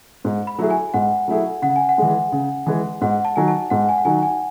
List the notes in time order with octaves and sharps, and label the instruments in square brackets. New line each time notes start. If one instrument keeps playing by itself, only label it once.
[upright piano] G#2
[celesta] B5
[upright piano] F#3 A3 E4 G#4
[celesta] G#5
[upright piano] G#2 [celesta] F#5
[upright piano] F#3 A3 E4 G#4
[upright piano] C#3 [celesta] F#5
[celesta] G#5
F#5
[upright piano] E3 G#3
C#3
E3 G#3
[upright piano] G#2 [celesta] F#5
[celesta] A5
[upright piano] D#3 F#3 [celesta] G#5
[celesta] A5
[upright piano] G#2 [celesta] F#5
[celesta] G#5
F#5
[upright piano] D#3 F#3 [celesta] G#5
[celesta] G#5